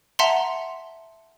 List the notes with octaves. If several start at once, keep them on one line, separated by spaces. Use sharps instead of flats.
E5 F#5 A5 A#5 C6